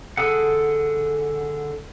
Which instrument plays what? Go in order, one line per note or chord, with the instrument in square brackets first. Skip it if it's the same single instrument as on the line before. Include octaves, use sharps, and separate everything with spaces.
[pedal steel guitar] D3 G#4 A4 F#5